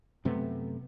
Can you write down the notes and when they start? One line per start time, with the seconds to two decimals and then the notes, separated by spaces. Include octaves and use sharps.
0.25 F#2 C3 A3 B3